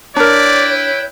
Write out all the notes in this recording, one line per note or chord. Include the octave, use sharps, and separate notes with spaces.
D4 E4 A#4 B4 C#5 D5 G5